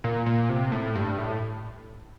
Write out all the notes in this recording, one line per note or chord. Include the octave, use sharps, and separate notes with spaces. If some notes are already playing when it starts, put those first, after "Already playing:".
A#2
A#2
C3
A2
G2
A2